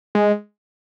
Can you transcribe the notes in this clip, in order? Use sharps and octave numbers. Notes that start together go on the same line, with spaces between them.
G#3